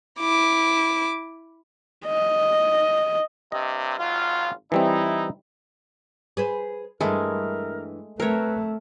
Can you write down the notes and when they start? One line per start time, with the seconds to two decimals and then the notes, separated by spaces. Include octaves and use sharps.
0.20 E4 D6
2.07 D#5
3.52 G2 C3 D#5
3.98 G#1 F#3 F4
4.72 E3 G3 C4 D#4 E4
6.37 G#4 B4 C5
7.01 G2 E3 G#3 A3 A#4
8.20 A3 C4 A#4 B4 C#5